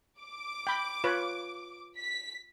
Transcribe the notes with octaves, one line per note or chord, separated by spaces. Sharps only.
D6
G5 B5
F4 B4 C#5
B6